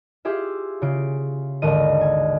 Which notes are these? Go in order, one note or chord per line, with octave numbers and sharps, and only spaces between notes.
F4 G4 G#4 E5
C#3 F4 D7
G#1 D#2 D3 D#4 D#5 D#7
G#5